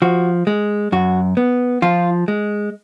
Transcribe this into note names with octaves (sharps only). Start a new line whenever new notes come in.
F3 F#4
G#3
F#2 F#4
B3
F3 F4
G#3